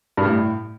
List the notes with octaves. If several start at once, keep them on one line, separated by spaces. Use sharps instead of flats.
G2
A2